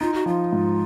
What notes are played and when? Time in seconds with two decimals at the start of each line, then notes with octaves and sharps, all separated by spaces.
0.01 D#4 F4
0.14 F#4
0.26 F3 F4
0.52 G#2